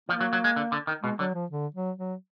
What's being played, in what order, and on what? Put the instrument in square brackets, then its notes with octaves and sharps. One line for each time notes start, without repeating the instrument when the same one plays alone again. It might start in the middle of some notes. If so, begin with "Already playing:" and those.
[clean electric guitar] F3 [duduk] A#3
[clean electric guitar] F#3
F#3
G#3
D3
D3
D#3
[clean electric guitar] B2 [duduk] G#3
[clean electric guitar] D3 [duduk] F#3
[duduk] F3
D3
F#3
F#3